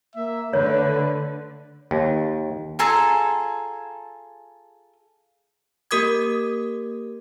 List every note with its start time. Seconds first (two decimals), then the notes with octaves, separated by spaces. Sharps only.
0.15 A#3 E5
0.53 D3 A3 B4 C#5
1.91 D#2
2.79 F4 G#4 A4 A#5
5.91 A#3 G4 A#4 D6 D#6 G#6